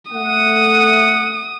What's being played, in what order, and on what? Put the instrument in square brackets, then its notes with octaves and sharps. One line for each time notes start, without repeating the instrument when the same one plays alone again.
[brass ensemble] A3 F#5 [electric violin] D#6